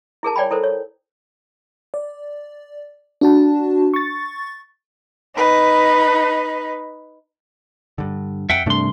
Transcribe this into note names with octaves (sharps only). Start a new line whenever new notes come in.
E4 G#4 A#4 A5
C#5 D5 G5 G#5 B5
E4 A4 A#4 C5
C#5
D5
D4 F#4 A5
C#6 A6
D#4 B4
G2 D3
F2 E5 F#5 G5
C2 G2 A3 D4 C6